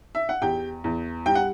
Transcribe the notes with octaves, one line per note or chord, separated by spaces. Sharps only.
E5
F#5
E2 G4 G5
E2
G3 G5
F#5